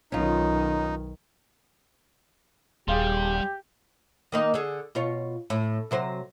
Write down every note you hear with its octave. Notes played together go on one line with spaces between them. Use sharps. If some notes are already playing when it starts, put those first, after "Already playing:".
B1 D#3 C#4 D#4 F4
D#1 G3 G4 G#4 F5 C6
D#3 A#3 D#4
D3 G#4
B2 F4 C#5
A2
C3 F#3 C5